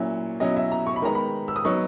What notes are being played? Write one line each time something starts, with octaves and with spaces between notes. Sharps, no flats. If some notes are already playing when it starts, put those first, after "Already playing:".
Already playing: A#2 F#3 C#4 E4
B2 F#3 C#4 E4 D#5
E5
A#5
C#6
B5
D#3 G#3 B3 A#5
B5
E6
D#6
F#3 B3 D#4 C#6